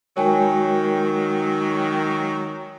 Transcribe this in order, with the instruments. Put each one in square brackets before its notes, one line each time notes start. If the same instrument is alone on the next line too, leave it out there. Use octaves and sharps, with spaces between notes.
[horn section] D#3 F#3 [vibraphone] G#3 F#4 A#4 [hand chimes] C#5 G5 G#5